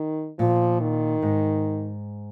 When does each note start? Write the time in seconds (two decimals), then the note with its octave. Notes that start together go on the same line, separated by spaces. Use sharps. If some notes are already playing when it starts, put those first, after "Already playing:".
Already playing: D#3
0.39 A#2 F3
0.81 D#3
1.22 G#2